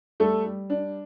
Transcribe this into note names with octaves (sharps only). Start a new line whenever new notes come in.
G3 A3 A4
G3
D4